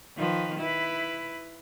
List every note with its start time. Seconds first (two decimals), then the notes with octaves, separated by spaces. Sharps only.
0.17 D#3 F3 B4
0.59 E4 B4